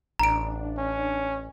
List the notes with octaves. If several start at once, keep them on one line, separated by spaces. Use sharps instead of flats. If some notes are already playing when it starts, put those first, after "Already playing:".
A1 D4 A#5 D7
C#4